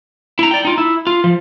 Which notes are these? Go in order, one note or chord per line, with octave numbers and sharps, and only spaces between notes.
E4 A#5
D5 G5
D#4 F4
E4
F4
F3